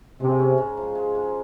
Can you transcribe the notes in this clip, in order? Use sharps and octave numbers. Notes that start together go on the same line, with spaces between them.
C3 G#3
C#4
G#2
F3
G#3
G#2